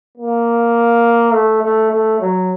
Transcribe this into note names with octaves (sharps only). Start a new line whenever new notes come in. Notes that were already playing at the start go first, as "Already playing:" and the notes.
A#3
A3
A3
A3
F#3